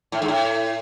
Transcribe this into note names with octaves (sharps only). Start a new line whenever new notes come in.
A2
G#2
A2